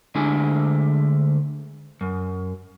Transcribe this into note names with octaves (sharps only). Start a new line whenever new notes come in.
D2 D3 G#3 A3 D4 G#5
F#2